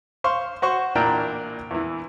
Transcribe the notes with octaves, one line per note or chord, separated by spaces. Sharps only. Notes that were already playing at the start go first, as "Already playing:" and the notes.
C5 F5 C6 C#6
F#4 C5 C#6
A1 A#2 D4 E4 A#4 G5
E2 E3